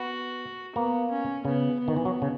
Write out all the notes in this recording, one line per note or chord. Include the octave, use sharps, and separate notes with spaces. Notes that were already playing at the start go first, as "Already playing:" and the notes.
Already playing: B3 F#4
A#3 B3
C#4
C#3 B3
B3
D#3
E3
F#3
C#3